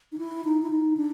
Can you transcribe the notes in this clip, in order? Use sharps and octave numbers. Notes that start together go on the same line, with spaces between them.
D#4
E4
D#4
E4
D#4
D4